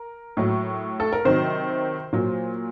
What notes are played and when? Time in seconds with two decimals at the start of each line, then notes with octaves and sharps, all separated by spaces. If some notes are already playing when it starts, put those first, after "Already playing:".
Already playing: A#4
0.37 A2 F#3
1.00 A4
1.13 A#4
1.25 C3 D#3 F#3 C5
2.13 A#2 F#3